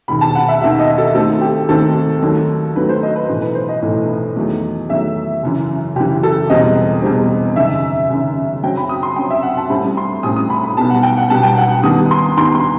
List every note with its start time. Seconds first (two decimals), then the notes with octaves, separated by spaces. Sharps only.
0.08 E1 D#2 D#3 B5
0.21 A5
0.35 F#5
0.48 E5
0.61 E1 D#2 D#3 E5
0.79 D#5
0.98 A4
1.15 D#2 D#3 A3 C4 A4
1.41 G4
1.69 D#2 D#3 A3 C4 A4
2.22 D#2 D#3 F#3 A3
2.76 D#2 D#3 F#3 A3 B4
2.89 C5
3.03 D#5
3.16 B4
3.29 B1 A2 E3 A3
3.42 B4
3.55 C5
3.69 D#5
3.82 B1 A2 E3 A3
4.36 E2 D#3 F#3 A3
4.89 E2 D#3 F#3 A3 E5
5.43 F#1 F#2 E3
5.96 F#1 F#2 E3 G4
6.23 A4
6.50 E1 E2 B2 G3 C4 D#5
7.02 E1 E2 B2 G3 C4
7.56 F#1 F#2 D#3 E5
8.10 F#1 F#2 D#3
8.63 F#2 F#3 C4 G5
8.77 B5
8.89 D#6
9.03 C6
9.16 F#2 F#3 C4 G5
9.30 E5
9.43 F#5
9.57 A5
9.70 A1 A2 G3 C4 B5
9.97 C6
10.23 A1 A2 G3 C4 D#6
10.36 D#6
10.50 B5
10.64 B5
10.77 B1 B2 G3 B3 A5
10.90 F#5
11.03 G5
11.17 F#5
11.30 B1 B2 G3 B3 A5
11.43 G5
11.58 F#5
11.83 D#2 D#3 G3 B3 D#6
12.11 C6
12.37 D#2 D#3 G3 B3 C6
12.55 C6